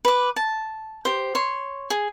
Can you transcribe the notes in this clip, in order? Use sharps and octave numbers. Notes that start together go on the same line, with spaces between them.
B4 D6
A5
G4 C5
C#5 C6
G#4